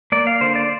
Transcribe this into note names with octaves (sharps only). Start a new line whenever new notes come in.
A#3 D5
F5
D3 C5
D5